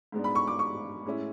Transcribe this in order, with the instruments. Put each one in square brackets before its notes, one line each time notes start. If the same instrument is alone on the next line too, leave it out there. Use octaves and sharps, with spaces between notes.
[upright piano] G#2 G#3 B3 D4
B5
C#6
D6
C#6
A2 G#3 C#4 E4